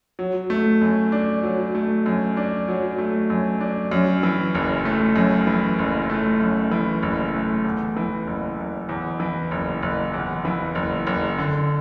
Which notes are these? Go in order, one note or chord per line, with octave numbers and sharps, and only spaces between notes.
F#3
A3
F#2
D4
F#3
A3
F#2
D4
F#3
A3
F#2
D4
F#2
E3
F#1
A3
F#2
E3
F#1
A3
F#2
E3
F#1
A3
E2
E3
F#1
F#1
E2
E3
F#1
F#1
E2
E3
F#1
F#1
D3